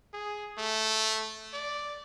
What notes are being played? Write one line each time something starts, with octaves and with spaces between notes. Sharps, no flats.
G#4
A3
D5